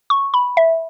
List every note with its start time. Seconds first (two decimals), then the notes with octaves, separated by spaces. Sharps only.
0.10 C#6
0.34 B5
0.57 E5